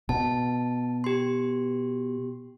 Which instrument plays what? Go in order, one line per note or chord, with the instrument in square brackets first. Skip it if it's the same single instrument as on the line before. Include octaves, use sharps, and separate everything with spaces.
[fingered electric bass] B2 [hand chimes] A5
[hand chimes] G4 C6